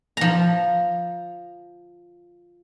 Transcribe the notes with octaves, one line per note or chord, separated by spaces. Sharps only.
F3 A#5